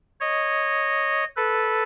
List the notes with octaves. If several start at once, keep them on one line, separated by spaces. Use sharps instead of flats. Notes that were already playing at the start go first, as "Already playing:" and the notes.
C#5 D#5
A4 B4